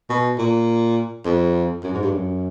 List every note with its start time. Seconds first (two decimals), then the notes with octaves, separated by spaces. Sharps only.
0.10 B2
0.38 A#2
1.25 F2
1.83 F#2
1.94 G#2
2.03 G2
2.12 F#2